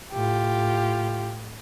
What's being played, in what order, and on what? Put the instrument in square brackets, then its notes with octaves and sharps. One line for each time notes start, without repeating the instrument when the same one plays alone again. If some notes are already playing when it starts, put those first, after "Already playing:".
[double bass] A2 [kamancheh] F4 G4